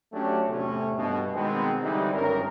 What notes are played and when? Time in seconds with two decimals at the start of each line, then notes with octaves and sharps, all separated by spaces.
0.13 F#3 A3 C#4 D4 F#4 G4
0.47 E2 A2 C3 A3 C4 C#4
0.97 G2 B2
1.34 B2 D#3 G#3 B3 C4
1.83 D3 E3 G3 C4 D#4 E4
2.14 G#1 G2 C#4 A#4